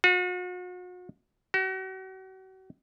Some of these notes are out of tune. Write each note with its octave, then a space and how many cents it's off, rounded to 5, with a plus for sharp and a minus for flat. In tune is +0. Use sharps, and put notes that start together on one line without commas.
F#4 -40
F#4 +40